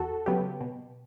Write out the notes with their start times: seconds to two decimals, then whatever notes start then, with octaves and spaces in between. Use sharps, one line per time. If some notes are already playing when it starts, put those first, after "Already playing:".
Already playing: E2 F#4 A4
0.26 C#3 F#3 B3 G4
0.61 B2